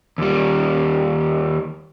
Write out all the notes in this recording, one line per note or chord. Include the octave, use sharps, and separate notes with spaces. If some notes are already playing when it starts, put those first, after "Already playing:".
D#2 G3